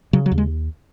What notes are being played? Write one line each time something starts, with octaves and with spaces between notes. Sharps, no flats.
C#3 F#3
F#3
D#2
G#3